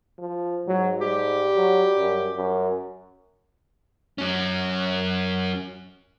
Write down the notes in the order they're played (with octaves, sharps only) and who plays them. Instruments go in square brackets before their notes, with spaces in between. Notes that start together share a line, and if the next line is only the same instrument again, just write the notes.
[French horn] F3
[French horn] G#2 [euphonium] F#3
[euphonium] G3 [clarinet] G4
[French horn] F#3
F#2
F#2
[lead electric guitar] F#3 C#4